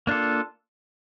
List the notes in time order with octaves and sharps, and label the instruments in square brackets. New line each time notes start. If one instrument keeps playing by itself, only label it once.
[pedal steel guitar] A#3 D4 F4 A4